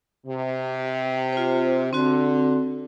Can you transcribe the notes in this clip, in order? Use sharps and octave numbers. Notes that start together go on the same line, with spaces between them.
C3
F4 C5
D3 C4 F#4